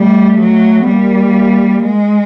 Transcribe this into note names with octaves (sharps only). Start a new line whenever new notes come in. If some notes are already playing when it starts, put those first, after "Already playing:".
Already playing: G3 A3
F#3
B3
G3 A#3
G#3